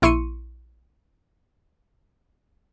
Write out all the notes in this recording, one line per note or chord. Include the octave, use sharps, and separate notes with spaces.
A#1 E4 C6 C#6 C#7 D#7